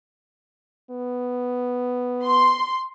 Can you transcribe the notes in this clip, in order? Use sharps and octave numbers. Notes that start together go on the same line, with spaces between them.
B3
C6